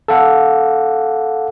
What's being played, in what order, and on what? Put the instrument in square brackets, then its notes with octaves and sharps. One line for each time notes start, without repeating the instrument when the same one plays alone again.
[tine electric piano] A4 F5 F#5